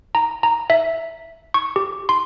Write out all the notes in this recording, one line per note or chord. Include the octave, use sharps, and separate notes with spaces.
A#5
A#5
E5
C#6
G4
C6